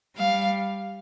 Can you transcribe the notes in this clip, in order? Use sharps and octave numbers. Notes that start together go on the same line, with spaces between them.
G3 F5